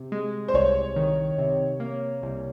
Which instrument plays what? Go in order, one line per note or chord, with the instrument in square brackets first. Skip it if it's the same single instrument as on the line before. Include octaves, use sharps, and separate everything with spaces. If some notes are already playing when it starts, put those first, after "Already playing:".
Already playing: [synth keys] C3
G#3
[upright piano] C5
[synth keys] C2 [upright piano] C#5
[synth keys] D#3
C3
A#3
C2